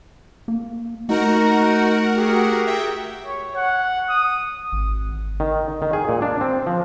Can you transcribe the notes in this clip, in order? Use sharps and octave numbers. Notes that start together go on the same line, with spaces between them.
A#3
A3 D#4 F#4 A#4 F#5
G4 G#4
E5 G5
C#5
F#5
D#6
G#1
D#3
D#3
G#4
A#2
D4
C4
F3